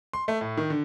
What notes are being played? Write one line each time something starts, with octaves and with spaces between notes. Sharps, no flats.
C6
A3
A2
D#3
D3